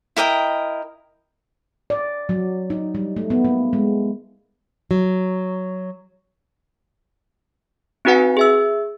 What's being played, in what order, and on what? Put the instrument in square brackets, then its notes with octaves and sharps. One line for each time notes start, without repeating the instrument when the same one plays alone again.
[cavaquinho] E4 A#4 D#5 G5
[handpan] D5
F#3
D#4
G3
A3
B3
A#3
G#3
[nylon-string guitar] F#3
[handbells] C4 D#4 F#4 B4 F#5 G#5
G#4 E5 E6